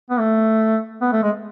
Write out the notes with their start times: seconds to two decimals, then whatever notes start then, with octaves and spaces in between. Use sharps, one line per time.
0.10 B3
0.19 A3
1.01 B3
1.12 A3
1.23 G#3